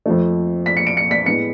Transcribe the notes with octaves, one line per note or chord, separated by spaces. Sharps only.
F2 F3 A3
B6
C#7
D7
C#7
B6
A2 G#3 B3 C#7